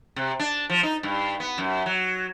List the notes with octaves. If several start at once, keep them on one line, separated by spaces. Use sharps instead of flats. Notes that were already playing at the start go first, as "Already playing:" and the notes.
C3
D4
F3
D#4
G2
B3
F#2
F#3